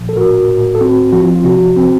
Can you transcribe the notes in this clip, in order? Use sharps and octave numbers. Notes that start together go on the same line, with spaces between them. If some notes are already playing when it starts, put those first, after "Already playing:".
Already playing: A#2 F3
A4
A2 F#4 A#4
A2
A4
C4 F#4
F3 F#4
F4
F4
C3 F#4
C4